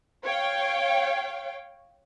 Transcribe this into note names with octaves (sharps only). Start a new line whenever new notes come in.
C#5 F5 G5